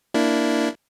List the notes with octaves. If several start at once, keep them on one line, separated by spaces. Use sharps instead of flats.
A#3 D4 E4